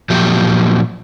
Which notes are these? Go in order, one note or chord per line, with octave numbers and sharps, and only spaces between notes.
A#2 F3 F#3 G4 E5